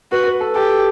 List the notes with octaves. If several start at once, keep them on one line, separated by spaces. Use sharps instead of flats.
F#4 B4
B4
A4
G4 A4